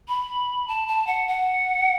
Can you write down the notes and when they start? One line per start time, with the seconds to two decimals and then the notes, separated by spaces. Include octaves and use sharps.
0.08 B5
0.68 A5
0.88 A5
1.07 F#5
1.28 F#5